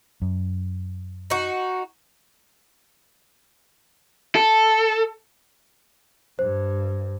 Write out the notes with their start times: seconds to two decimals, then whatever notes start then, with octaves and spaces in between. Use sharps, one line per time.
0.22 F#2
1.30 D#4 F#4
4.35 A4
6.39 G2 C5